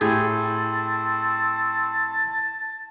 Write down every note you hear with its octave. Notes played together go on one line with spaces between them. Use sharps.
A2 C4 G4 G#4 A5